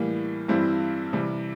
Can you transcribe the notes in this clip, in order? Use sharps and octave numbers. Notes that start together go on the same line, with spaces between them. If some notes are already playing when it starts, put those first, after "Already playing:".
Already playing: A2 E3 G3 A#3
G2 E3 G3 C4 E4
C3 E3 G3